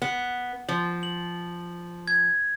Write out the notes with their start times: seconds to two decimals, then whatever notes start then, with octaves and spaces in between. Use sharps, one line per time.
0.02 B3
0.69 F3
1.03 F#7
2.08 G#6